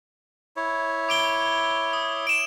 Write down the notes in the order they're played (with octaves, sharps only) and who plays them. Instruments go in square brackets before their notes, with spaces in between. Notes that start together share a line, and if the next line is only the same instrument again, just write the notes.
[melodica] E4 C#5
[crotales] D6 D7 G7
D#6
D7 E7